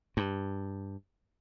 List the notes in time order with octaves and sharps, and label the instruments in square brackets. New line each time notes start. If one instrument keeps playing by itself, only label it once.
[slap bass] G2